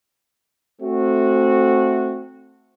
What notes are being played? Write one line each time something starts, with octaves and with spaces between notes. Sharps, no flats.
A3 C4 F#4